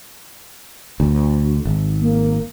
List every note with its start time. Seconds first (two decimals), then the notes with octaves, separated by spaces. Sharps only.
1.00 D2
1.65 G#1
2.01 A#3